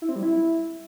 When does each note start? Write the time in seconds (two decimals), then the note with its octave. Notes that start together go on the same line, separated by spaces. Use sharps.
0.02 E4
0.09 C4
0.16 G3
0.23 E4